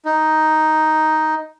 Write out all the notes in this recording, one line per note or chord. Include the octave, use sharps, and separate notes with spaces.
D#4